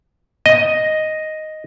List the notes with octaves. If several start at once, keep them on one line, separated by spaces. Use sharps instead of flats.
D#5